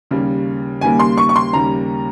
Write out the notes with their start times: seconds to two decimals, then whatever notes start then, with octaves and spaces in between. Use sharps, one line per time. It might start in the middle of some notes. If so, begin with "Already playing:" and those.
0.11 D#2 C#3 G3 A#3
0.81 D#2 C#3 G3 A#3 G#5
0.99 C6
1.18 C#6
1.29 C#6
1.36 C6
1.53 D#2 C#3 G3 A#3 A#5